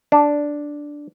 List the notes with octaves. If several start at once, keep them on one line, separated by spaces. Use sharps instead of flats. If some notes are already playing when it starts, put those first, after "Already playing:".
D4